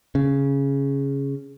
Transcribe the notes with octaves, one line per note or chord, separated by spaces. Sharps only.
C#3